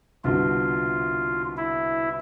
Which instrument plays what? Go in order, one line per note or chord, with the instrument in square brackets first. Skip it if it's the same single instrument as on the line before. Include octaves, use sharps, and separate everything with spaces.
[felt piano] C2 B2 D3 [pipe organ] F4
[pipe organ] E4